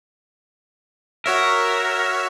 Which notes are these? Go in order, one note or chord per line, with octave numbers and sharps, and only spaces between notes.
F#4 A#4 C#5 E5